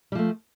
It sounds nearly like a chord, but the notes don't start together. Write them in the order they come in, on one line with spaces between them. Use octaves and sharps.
G3 F3 A3